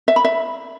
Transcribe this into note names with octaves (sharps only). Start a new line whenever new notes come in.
E5
B5
E5